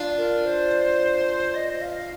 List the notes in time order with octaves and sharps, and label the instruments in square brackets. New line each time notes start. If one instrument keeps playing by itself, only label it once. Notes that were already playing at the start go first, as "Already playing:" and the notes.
Already playing: [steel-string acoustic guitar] D4 F4
[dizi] A#4
C5
D#5
F5